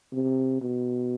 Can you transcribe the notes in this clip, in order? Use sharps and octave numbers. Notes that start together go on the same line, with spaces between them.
C3
B2